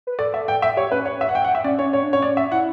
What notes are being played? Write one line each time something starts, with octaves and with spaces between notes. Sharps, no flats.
B4
A4 D5
E5
G5
E5
G4 C#5
C#4 B4
C#5
E5
F#5
G5
F#5
E5
C#4 D5
C#4 C#5
C#4 C#5
D4
C#4 C#5
D5
E5
E4 F#5